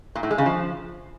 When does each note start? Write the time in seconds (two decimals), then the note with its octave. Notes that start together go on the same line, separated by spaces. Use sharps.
0.15 A#2
0.23 A2
0.31 G#3
0.38 C#3
0.46 F3